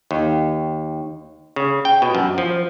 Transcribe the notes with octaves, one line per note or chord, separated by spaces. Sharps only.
D#2
C#3
G5
B2
F#2
F3